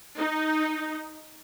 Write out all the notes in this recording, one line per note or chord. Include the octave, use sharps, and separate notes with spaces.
D#4